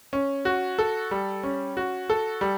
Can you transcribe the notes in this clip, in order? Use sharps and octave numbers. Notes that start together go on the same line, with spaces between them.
C#4
F#4
A4
G3
C#4
F#4
A4
G3